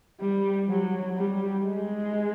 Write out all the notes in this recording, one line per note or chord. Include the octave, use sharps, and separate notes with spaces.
G3
F#3
G3
G#3